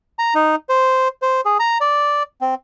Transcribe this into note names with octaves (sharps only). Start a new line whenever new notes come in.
A#5
D#4
C5
C5
G#4
A#5
D5
C4